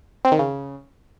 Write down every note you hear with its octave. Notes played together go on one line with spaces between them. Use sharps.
C4
D#3
C#3